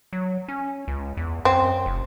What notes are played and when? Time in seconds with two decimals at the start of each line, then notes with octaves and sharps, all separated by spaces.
0.13 F#3
0.48 C#4
0.88 C#2
1.17 E2
1.45 F#2 C4
1.86 F1